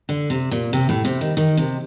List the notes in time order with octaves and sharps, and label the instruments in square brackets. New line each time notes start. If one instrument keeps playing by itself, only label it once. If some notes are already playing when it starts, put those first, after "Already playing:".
[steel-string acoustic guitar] D3
C3
A#2
C3
A2
C3
D#3
D#3
C3